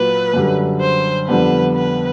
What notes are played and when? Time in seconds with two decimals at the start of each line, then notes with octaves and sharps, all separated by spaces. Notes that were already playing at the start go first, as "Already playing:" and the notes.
Already playing: A#2 F#3 A#3 B4
0.34 F#2 D3 G3
0.81 C5
1.28 F2 D3 G3 B3 D4 B4
1.76 B4